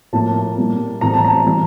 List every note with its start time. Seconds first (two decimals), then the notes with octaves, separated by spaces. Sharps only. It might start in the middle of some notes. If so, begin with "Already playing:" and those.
0.13 A2 F3 A#3 A5
0.57 A#2 G3 A#3
1.01 A2 E3 A3 C4 A#5
1.14 A5
1.25 A#5
1.46 E3 G3